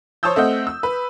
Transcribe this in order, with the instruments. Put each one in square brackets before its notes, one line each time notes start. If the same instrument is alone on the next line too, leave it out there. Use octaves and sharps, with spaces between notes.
[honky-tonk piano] C5 C#5 A5 D#6 E6 G6
A3 C4 D#5 F#5
E6
B4